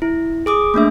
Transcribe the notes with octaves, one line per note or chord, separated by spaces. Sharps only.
E4
G#4 D6 D#6
A3 A#3 D4 E5